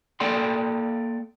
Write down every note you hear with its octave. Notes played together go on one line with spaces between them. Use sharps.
A#3 A4 D5 G5 C6